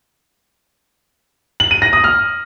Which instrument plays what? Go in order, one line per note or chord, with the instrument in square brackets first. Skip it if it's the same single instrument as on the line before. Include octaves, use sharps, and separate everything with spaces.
[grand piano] F#7
D#7
A#6
D#6
F6